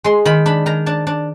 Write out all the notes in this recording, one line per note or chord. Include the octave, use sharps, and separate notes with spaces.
G#3 C6
D#3 B5
D4 B5
D#3 A#5
D4 A5
D4